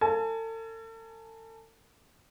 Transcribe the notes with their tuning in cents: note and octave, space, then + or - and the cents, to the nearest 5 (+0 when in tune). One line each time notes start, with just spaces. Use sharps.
A4 +40 G#5 +35